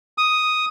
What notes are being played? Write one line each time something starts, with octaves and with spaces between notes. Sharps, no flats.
D#6